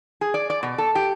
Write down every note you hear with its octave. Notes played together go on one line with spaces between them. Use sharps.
G#4
D5
D5
B2
A4
G4